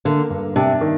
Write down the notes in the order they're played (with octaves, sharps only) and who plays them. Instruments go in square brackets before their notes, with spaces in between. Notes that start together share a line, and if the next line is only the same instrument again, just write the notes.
[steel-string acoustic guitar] D3 [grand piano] A#3
[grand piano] G2
[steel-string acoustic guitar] C3 [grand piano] D4
[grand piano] D#3